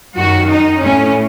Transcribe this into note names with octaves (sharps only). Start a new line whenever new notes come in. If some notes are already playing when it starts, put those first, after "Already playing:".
F#2 D#3 F#4
D#4
A2 C#4